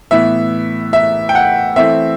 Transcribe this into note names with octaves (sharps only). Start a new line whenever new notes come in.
A2 E3 B3 E5
E5
G5
F#5
E3 A3 C4 E5